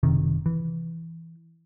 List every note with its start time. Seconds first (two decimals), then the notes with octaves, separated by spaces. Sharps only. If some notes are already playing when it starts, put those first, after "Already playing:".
0.03 F#1 C3 D#3
0.46 E3